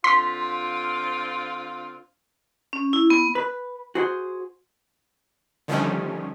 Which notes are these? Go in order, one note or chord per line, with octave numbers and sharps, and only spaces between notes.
D3 C4 F4 C6 B6
C#4
E4
B3
B4
F#4 G#4 C5
D3 D#3 F3 G3 A3 C#4